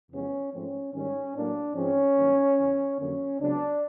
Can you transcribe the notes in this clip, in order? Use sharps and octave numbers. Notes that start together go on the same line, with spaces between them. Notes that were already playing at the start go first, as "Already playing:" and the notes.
E2 C3 F3 G#3 B3 C#4
G#2 F3 A3 C4 C#4
G#2 D#3 G3 C#4
A2 F#3 A#3 D4
G#2 F3 G#3 C4 C#4
G2 D#3 F#3 A#3
E2 C#3 E3
F2 D3 F#3 A#3 C#4
C#2 C#3 F#3 B3 D4